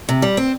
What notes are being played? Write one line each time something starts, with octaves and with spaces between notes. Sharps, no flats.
C3
G3
C4